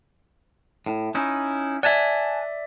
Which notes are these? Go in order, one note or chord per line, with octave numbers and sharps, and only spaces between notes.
A2
C#4 D#4 E4
D5 E5 F#5 G#5 A5